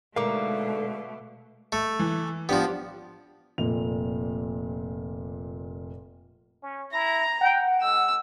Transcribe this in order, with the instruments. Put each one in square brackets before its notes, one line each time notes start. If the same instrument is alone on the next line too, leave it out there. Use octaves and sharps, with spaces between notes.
[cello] B2 A3 [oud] D3 D#4 A#4 [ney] G#3 [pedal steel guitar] F5 D6
[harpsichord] A3
[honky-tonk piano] E3
[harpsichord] F3 B3 [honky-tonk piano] D4 G4
[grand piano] F1 A#2 F7
[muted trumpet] C#4
[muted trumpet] E4 [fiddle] A#5 [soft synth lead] A#6
[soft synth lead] F#5 [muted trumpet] G5
[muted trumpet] G#3 [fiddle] E6